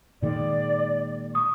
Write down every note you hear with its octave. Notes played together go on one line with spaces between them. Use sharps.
A#2 D#3 G#3 D5
C#6 D#6